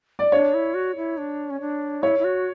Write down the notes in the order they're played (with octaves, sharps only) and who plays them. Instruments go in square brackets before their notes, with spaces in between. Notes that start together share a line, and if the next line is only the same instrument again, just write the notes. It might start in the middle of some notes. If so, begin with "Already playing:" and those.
[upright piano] D5
[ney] D4 [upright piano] C#5
[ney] E4
F#4
E4
D4
C#4
D4
[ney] E4 [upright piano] C#5
[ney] E4
F#4